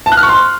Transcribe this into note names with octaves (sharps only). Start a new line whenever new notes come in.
A5
F#6
F6
C#6
C6